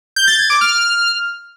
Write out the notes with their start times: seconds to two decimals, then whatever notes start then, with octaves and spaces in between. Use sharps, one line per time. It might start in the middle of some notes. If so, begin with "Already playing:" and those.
0.16 G6
0.28 A6
0.39 G#6
0.50 D6
0.61 F6